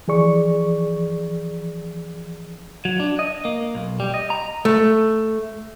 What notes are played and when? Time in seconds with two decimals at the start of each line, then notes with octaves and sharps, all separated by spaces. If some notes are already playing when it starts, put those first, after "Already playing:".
0.08 E3 F3 G#4 D5 C#6
2.85 F#3
3.00 D4
3.19 D#5
3.45 A#3
3.75 B1
4.00 G3
4.14 D#5
4.30 A#5
4.65 A3